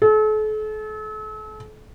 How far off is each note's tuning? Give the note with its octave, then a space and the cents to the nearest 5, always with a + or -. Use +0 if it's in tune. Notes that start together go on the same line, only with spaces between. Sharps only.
A4 -40